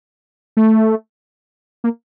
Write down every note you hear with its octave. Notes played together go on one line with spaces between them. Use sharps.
A3
A#3